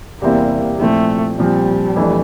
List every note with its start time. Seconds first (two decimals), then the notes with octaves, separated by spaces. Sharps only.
0.21 E2 C3 G3 A#3 C4 E4
0.80 A#2 F3 A3 C4 E4
1.38 A#2 F3 G3 C4
1.96 F2 E3 A3 D4